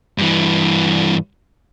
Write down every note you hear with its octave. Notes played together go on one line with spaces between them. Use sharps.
G2 E3